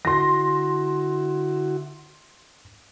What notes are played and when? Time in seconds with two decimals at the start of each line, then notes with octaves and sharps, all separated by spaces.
0.05 D3 E4 F#4 C6 A#6